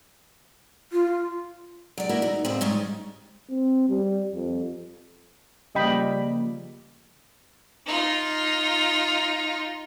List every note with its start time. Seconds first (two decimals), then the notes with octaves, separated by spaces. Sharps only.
0.92 F4
1.98 F#3 D5
2.09 A#3 E4 F#4 A#4
2.22 D#4
2.45 A2 C#3 C4
2.61 G#2 G3 C#4 D#5
3.50 C4
3.89 G3
4.33 F2
5.75 C#3 F3 G3 A#3 D#5 G5 B5
7.86 D#4 F4